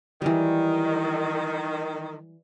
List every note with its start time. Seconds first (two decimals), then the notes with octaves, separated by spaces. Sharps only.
0.22 D#3 E3 F#3 G3